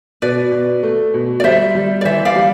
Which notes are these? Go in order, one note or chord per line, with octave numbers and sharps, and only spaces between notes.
B2 B4 D5
B2
A3
B2
D5
G3 C5 E5
G3
D5
E3 C5 E5
D5 F5
G3